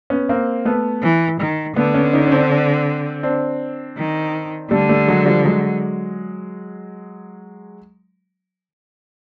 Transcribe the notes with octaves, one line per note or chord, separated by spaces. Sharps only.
B3 C#4
A#3 C4
A3 B3
E3
D#3
D3 A3 B3
B3 C#4
C#4 D#4
C#4
C4 D4
C4 D4
D#3
D3 G3 A3
G3 A3
F#3 G#3
F3 G3
F#3 G#3